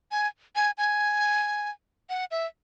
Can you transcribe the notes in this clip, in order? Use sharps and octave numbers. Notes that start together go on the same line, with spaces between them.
G#5
G#5
G#5
F#5
E5